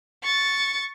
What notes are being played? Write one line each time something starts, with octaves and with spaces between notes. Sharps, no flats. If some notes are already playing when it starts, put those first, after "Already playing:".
C#6 A6